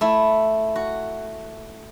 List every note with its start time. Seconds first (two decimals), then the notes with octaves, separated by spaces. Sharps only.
0.01 A3 E4
0.76 F#4